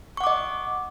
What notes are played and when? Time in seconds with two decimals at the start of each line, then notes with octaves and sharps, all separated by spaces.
0.17 C#6
0.21 F#5
0.24 D6
0.27 D#5